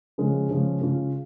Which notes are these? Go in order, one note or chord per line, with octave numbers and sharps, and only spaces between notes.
C#3 F3 G#3 C#4
C#3 F3 G#3 C#4
C#3 G#3 C#4 F4